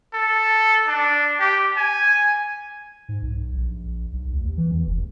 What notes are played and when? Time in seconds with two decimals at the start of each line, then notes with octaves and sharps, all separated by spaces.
0.13 A4
0.88 D4
1.39 G4
1.76 G#5
3.09 G#2
3.22 B1
3.54 A#1
3.84 A#1
4.12 B1
4.32 D2
4.45 D#2
4.57 E3
4.71 E2
4.85 F1